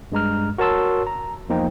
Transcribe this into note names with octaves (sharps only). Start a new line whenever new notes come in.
G2 G#3 A#5 F6
F#4 A#4 C#5 A5 C6 E6
A#5
E2 F3 A#3 D#4 C5 G5